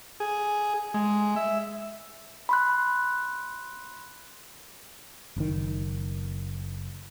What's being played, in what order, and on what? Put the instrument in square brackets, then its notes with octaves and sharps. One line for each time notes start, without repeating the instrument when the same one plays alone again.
[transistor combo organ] G#4
G#3
E5
[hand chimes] B5 C6 F#6
[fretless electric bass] F#1 D#3